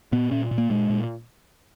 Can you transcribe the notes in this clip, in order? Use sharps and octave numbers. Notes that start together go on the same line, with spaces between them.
A#2 B3
A#2 C#4
A#2
A#3
A#2 G#3
A#2